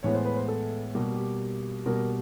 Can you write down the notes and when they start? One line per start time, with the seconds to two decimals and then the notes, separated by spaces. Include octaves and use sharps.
0.03 A2 E3 G#3 B3 C#5
0.15 C5
0.25 B4
0.36 C5
0.48 A4
0.95 B2 G3 A#3 G4
1.14 G4
1.86 B2 G3 A#3 A#4